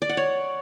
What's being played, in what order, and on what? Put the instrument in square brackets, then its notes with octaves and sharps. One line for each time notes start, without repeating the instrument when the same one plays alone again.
[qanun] D5
F#5
C#5